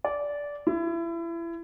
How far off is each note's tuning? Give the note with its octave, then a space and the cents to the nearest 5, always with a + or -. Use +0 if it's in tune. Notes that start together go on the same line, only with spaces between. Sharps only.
D5 -15
E4 +30